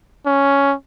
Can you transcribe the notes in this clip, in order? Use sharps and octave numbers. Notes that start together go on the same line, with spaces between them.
C#4